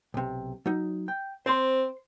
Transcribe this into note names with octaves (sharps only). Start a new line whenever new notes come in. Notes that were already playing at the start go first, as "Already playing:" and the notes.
B1 C3
F#3 D#4
G5
C4 C5 C6